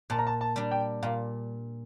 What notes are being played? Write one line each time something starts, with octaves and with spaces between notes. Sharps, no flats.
A#2 A5
A#5
A5
A5
G3 D4
G5
A#2 F5